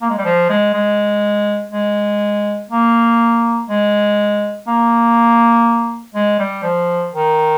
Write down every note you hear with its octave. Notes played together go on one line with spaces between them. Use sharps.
A#3
G#3
G3
F3
G#3
G#3
G#3
A#3
G#3
A#3
G#3
G3
F3
D#3